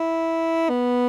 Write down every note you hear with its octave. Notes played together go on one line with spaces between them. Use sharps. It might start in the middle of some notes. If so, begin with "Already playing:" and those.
Already playing: E4
B3